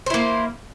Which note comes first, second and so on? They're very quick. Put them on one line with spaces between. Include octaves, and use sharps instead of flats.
C5 E4 A#3